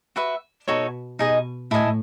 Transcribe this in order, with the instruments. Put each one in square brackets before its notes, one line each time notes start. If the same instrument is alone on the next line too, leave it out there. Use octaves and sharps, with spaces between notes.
[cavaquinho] F#4 B4 E5
[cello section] B2 [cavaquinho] D#4 F#4 A4 C#5
[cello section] B2 [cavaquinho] D#4 G#4 D#5
[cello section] A2 [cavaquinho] E4 A4 D#5 G#5